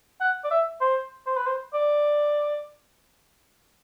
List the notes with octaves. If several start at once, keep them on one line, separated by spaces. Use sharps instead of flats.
F#5
D5
E5
C5
C5
B4
C5
D5